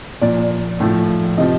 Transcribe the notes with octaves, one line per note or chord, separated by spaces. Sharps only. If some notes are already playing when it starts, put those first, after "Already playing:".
A#2 F3 D5
A2 F3
C3 F3 D#5